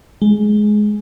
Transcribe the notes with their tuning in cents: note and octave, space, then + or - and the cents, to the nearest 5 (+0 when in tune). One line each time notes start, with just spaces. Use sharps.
G#3 +15